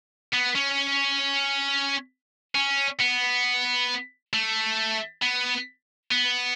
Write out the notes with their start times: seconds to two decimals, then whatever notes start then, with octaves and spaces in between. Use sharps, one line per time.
0.33 B3
0.55 C#4
2.55 C#4
3.00 B3
4.33 A3
5.22 B3
6.11 B3